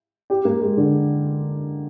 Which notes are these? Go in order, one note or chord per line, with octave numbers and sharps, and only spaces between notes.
G4
A#3
G#3
D3